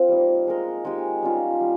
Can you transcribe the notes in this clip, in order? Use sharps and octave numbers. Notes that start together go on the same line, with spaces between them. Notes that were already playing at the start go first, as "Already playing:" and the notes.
Already playing: C4 F4 C5
G3 A#3 D#4
G#3 D#4 A#4 D#5
G#3 D#4 G4
G3 C#4 F4
G3